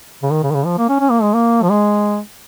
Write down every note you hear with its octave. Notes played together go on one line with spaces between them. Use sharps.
C#3
D#3
C#3
D#3
C#3
F3
A#3
C#4
C#4
A#3
G#3
A#3
F3
G#3